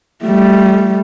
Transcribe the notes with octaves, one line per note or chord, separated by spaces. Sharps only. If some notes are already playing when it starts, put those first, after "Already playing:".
G3 A3